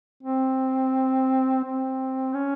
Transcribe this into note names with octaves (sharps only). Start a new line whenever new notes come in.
C4
C4
C#4